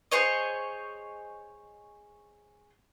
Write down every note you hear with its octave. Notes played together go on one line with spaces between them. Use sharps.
G#4 C5 C#5 D#5